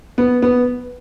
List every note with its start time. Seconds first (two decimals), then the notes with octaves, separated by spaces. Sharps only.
0.18 B3
0.42 B3